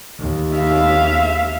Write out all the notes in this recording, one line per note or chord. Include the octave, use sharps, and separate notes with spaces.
D#2
E5 F5